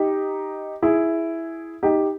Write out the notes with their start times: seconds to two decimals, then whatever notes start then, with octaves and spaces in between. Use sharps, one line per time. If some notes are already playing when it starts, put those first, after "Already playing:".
Already playing: D#4 G4
0.82 E4 G#4
1.83 D#4 G4